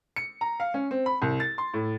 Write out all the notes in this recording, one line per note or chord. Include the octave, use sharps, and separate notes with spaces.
C#7
A#5
F5
C#4
C4
B5
C2
A6
C6
A2